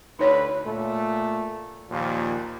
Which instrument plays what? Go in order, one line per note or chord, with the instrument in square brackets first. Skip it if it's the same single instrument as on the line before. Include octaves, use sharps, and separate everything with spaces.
[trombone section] D2 B4 [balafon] D#4 C#5 D5
[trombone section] A#2 A3
D#2 A#2 F3